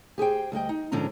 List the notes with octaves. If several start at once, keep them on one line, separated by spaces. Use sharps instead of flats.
G4 G#4 C5 G5
D2 G3 D#5 G5
D#4
G#2 D3 F3 C#4 D4 A#5